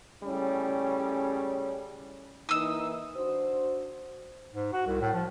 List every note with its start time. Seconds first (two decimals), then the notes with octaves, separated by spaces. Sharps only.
0.24 A2 C#3 G3 C#4
2.49 E3 A#3 D#4 D#6 E6
3.15 D4 F#4 C5
4.54 G#2
4.73 F#4
4.87 C2
5.01 A2
5.14 F3